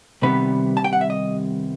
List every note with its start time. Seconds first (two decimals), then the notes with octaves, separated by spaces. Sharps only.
0.22 C2 C3 D#3 G3 B3 B4
0.77 A5
0.84 G5
0.93 F#5
1.01 E5
1.10 D#5